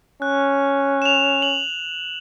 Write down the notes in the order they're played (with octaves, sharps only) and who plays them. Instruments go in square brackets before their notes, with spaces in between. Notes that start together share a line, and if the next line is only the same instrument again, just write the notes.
[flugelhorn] C#4 [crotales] F#6
[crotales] E7 F7
F#7